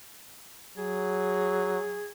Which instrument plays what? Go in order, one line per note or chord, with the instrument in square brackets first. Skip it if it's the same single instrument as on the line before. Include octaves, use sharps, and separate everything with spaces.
[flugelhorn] F#3 [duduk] G#4